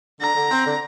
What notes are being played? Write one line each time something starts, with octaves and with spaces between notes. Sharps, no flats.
D3 A#5
D3
C4
D3